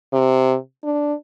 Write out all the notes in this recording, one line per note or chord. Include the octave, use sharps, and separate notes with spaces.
C3
D4